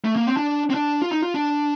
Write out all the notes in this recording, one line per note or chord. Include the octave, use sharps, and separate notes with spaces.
A3
A#3
C4
D4
C4
D4
F4
D#4
F4
D4